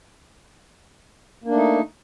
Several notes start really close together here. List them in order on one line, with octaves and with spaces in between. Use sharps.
A#3 D4 A3 D#4